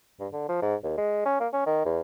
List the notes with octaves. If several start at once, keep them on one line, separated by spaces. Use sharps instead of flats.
G2
D3
F3
G#2
D#2
G#3
C#4
A#3
C#4
D#3
E2